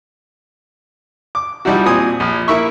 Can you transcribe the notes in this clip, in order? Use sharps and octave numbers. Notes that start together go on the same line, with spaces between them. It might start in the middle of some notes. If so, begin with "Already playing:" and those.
D6
F3 G3 D#4 E4 F#4
A#2 C4 G#5 D#6
A#1
A#3 E4 E5 B5 C#6